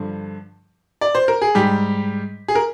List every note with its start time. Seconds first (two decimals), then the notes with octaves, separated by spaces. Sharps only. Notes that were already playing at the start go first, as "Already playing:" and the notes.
Already playing: G2 D3 F3
1.01 D5
1.15 C5
1.28 A#4
1.42 G#4
1.55 G#2 G3 G4
2.48 G#4
2.55 A#4